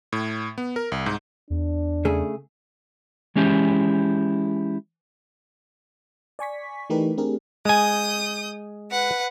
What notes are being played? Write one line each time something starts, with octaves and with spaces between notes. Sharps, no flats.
A2
B3
A#4
C2
G#2
E2 D4
C#3 A3 G#4
E3 G#3 C#4 E4 G4
D5 G#5 C#6 B6
E3 A3 D#4 G4 A#4 B4
A3 C4 D4 G4 G#4 A#4
G#3 G#5 D#6 G6
B4 F#5